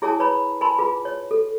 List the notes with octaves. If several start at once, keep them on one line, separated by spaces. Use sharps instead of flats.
E4 G#4 C#5 G#5 A5 D#6
B4 C#5 A#5 B5
A#4 G#5 A5 B5 C6
F4 G#4 B4
C#5
A4